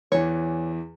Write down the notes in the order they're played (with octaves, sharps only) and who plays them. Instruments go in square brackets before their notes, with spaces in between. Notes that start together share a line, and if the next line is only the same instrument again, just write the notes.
[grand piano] E2 E3 [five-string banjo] C#5